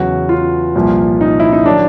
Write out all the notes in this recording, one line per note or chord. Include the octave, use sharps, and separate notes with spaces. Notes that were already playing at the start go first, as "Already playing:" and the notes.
Already playing: E2 C#3 F#3 F#4
F4
C2 A#2 F3
D#4
E4
D#4
D#3 F#3 D4